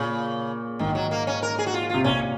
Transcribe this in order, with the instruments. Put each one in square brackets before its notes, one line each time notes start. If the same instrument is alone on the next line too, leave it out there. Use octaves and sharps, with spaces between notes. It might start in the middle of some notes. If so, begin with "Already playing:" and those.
Already playing: [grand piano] A#2 [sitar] C#3
[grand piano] G#2 [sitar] D#3
[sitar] F#3
A#3
C#4
A#4
G#4
F#4
F4
[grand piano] C3 [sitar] F4
[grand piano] A#2 [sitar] C#4